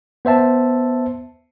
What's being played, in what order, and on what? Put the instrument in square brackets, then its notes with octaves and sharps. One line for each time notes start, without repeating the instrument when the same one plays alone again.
[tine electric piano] B3 C5 E5 A5